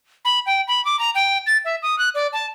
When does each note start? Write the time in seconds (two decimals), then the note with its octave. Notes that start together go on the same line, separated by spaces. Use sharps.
0.25 B5
0.46 G5
0.68 B5
0.85 D6
0.99 A#5
1.15 G5
1.47 A6
1.65 E5
1.83 D#6
1.99 F#6
2.14 D5
2.33 A5